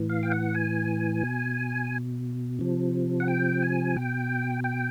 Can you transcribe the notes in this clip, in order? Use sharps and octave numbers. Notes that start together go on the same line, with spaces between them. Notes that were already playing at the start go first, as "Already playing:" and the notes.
Already playing: A2 E3
F5
G5
F#5
G#5
B2
C3 F3
F#5
G5
G#5
B2 G5
G5